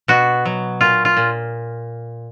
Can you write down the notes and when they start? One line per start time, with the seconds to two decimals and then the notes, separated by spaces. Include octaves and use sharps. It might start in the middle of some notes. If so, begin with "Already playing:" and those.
0.08 B2 F#4
0.45 F#3
0.81 A#2 F4
1.05 F4
1.17 A#2